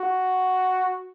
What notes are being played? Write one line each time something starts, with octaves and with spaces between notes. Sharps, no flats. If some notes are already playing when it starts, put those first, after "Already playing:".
Already playing: F#4